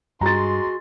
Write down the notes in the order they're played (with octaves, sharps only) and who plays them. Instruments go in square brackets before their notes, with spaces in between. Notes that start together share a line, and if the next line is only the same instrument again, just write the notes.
[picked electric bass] G2 [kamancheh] G#3 C6 [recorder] F#4 [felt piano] A#5 A6